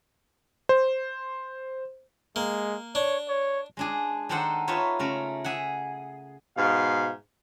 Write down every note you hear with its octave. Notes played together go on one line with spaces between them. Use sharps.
C5
G#3 A#3
D4 C#5
C#5
G#3 D4 G#4
D#3 D4 D#4 A4 C5 F#5
D#4 F4 B4 C#5 E5
C#3 A3 A#4
G#4 E5 F#5
G#2 B2 F5